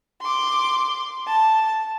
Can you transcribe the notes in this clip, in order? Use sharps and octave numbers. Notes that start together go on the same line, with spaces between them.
C6 D6
A5